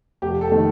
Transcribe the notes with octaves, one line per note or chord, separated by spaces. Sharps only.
F1 G4
A4
D#3 A3